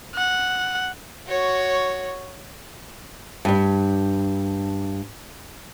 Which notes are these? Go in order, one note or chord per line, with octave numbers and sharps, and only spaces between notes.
F#5
F#4 C#5
G2 G3